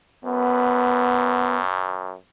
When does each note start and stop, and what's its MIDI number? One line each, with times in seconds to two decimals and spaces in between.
0.25 2.15 42
0.25 1.61 59